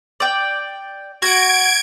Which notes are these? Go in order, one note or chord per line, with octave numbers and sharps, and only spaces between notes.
D5 G5
F#4 G#6 D7